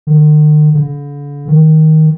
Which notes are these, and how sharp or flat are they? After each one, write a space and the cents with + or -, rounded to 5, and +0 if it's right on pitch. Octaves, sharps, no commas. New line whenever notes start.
D#3 -45
D3 -40
D#3 +10